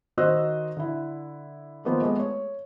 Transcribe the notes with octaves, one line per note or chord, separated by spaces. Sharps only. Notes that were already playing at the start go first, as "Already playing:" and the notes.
D#3 F#4 C5 D#5 E6 F#6
D3 E4
D#3 F3 A#3 B3 C5
G#3 A3 B3
C#5